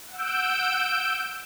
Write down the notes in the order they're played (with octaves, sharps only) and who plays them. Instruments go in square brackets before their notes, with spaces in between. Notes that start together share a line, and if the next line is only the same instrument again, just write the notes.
[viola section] F#5 [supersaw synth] E6 G6 D7